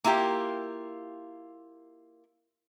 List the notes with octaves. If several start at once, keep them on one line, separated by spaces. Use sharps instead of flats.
A#3 E4 F4 G4